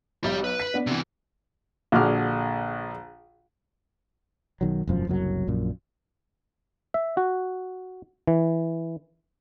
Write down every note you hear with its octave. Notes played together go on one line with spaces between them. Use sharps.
B1 G4 B5
B4
B6
B3 D4
C3 E3
A#1 D3 F#4 G#4 D6 F6
B1 D#3 F#3
E1 F#2 F3
F#1 C2 F#2 F#3
A#1 F#2 A#2
E5
F#4
E3